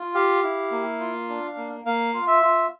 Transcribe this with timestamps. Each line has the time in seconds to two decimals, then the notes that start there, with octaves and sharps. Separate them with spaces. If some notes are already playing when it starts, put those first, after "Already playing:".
Already playing: F4
0.15 G4 F5
0.43 E4
0.71 A#3
1.00 F4
1.29 D4
1.57 A#3
1.85 A#3 F5
2.14 F4
2.27 E5
2.43 F4